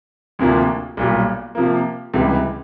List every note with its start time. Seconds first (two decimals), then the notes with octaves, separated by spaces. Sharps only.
0.39 D2 C3 F3 A#3 D4
0.97 B1 A#2 G3
1.55 C3 F3 A#3
2.14 C#2 C3 E3 G3